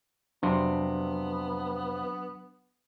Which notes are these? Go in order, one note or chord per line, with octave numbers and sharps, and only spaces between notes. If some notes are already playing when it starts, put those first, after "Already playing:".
F2 C3 F#3 B3 D4